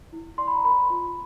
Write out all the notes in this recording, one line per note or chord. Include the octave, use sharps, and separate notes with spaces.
E4
D5 C6
B5
A#5
A#4 B5
F4